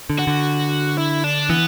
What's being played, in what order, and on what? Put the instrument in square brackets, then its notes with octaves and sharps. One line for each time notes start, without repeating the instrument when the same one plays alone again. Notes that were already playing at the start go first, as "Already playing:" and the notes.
[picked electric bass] D3
[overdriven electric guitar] F#4
[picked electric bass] D3
[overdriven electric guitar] E4
D4
[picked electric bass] E3 [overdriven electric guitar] B3